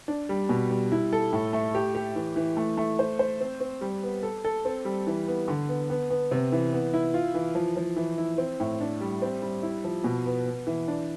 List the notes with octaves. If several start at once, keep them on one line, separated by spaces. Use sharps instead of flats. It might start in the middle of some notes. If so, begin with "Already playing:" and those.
D4
G3
B2
G3
E4
A4
A2
A3
G4
G4
E3
E3
A3
A3
C5
C5
C4
C4
G3
B3
A4
A4
C4
G3
E3
B3
D3
B3
B3
B3
C3
E3
B3
E4
F4
E3
F3
F3
E3
E4
C4
A2
D4
G3
C4
G3
E4
F3
B2
B3
B3
E3
D4